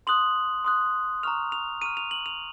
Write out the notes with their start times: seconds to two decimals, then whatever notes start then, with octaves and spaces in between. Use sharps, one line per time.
0.07 C6 D#6 F#6 F#7
0.65 C6 D#6 F#6
1.23 A#5 C#6 F6 F7
1.52 F7
1.82 A#5 C#6 F6 D#7
1.97 F7
2.11 F#7
2.26 F7